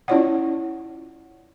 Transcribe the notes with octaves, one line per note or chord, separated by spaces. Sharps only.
C#4 E4 F4 C#5 D5 F#5